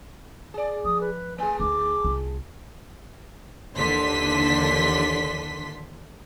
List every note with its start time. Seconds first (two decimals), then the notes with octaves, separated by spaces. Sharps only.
0.54 G#4 D5
0.85 F3 D#6
1.01 B4
1.38 A3 G#4 G#5
1.60 D2 D#4 D6
2.04 C2 F4
3.76 D#2 D3 E3 D4 C6 B6